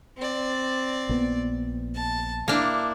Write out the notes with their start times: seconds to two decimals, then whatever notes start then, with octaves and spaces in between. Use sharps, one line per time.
0.17 C4 D5
1.09 A#1 B3
1.95 A5
2.48 A#3 D4 E4